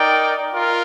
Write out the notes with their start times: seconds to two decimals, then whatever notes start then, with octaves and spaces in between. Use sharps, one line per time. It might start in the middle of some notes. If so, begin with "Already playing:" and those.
Already playing: D#4 A#4 D5 G5
0.54 F4 A#4